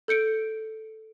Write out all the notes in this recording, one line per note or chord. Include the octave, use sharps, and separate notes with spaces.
A4 G6 C#7 D7